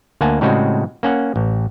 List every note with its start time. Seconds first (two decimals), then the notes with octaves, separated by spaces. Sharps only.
0.21 D2 A#3 F#5 G#5 A5
0.41 A2 C#3 G3 G#3 C4 F#4
1.03 A#3 C#4 F#5
1.36 A1